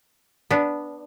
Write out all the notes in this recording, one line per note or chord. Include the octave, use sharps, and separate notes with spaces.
B3 D4